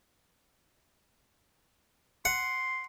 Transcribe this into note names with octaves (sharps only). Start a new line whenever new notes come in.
F#5 C6